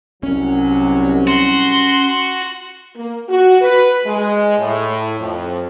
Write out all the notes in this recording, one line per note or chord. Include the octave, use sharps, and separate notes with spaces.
C2 F#3 C#4
F#4 C6
A#3
F#4
B4
G#3
A2
F2